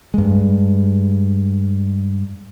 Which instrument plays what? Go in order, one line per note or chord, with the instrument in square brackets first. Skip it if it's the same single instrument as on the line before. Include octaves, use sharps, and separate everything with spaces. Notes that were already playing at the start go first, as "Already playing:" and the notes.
[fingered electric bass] G2 G#3